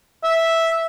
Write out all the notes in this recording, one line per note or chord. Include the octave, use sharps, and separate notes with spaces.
E5